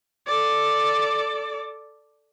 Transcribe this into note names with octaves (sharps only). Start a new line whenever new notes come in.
A4 D5